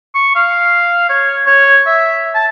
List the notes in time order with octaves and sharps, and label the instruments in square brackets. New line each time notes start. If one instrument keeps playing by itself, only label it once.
[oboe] C#6
F5
C#5
C#5
E5
A5